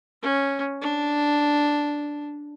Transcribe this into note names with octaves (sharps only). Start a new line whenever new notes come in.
C#4
D4